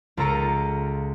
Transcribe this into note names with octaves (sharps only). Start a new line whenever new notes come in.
C#2 F4 A4 A#5 C#7 D#7